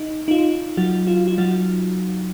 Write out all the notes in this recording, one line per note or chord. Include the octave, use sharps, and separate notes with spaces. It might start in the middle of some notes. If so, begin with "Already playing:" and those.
Already playing: D#4
D#4
F4
F#3 F#4
F4
F4
F#3 F#4